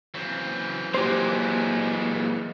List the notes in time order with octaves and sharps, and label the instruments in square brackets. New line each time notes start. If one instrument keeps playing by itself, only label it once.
[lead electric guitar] C#3 F#3 [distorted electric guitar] E3 C4
[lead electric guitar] A#2 [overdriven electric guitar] F#3 G#3 [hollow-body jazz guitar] G4 C5